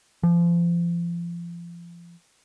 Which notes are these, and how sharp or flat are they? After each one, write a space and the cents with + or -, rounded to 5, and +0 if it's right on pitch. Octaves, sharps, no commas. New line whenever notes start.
F3 -30